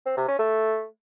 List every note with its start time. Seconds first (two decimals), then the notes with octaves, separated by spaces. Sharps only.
0.06 C4
0.17 C3
0.28 C#4
0.39 A3